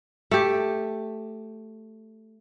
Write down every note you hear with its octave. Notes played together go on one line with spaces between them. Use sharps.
A3 G4